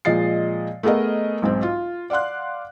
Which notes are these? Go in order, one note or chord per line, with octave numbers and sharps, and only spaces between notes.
A#2 F3 G#3 D#5 A6 C7
A3 B3 G#4 A#4 D#5
B1 G#2 C4
F4
D5 F5 F#5 C6 F#6